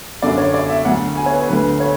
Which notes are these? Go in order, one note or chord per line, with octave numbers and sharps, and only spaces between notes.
F#2 D3 F#3 D5
C#5
D5
E5
D2 D3 F#3 F#5
G#5
C#5
B4
D2 D3 F#3 B4
C#5